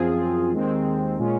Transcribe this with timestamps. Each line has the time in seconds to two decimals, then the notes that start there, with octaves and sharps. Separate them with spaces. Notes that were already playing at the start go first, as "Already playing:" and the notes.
Already playing: F#2 F3 C4 F4 G#4
0.51 D#2 D#3 G#3 C4
1.19 A#2 G#3 C#4 F4